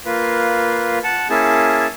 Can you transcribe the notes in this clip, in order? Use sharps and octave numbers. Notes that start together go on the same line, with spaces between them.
A#3 F4 B4
F#5 A5
A#3 C#4 E4 G#4 A5